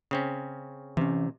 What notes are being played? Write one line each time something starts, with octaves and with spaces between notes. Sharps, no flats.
C#3 C4 C#4
C3 E3 C#4